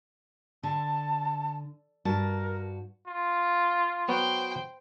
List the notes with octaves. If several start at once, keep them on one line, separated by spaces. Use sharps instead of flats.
D3 A5
G2 F#4 A#4 A5
F4
F#3 B3 F#4 C5 G5